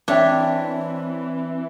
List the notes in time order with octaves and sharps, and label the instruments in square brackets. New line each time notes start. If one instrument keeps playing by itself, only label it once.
[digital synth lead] E3 [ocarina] C4 [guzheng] D4 [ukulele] C#5 E5 G5